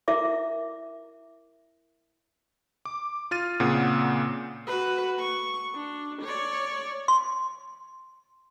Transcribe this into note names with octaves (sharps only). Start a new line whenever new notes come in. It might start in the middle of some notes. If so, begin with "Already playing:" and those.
E4 A#4 E5 D6
D6
F4 F6 A6 D#7
A#2 C#3 A#3 C4 F#5 D#6
F#4 B4
C#6
D4
C#5 D5
C6